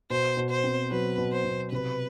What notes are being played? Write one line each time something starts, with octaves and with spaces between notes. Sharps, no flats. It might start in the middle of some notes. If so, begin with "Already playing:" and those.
B2 C5
B2
C5
C4
F#3 B4
B2
C5
B2
C3 B4